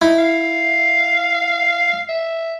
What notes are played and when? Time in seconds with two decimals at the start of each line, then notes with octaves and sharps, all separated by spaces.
0.02 D#4 E4
0.18 F5
2.09 E5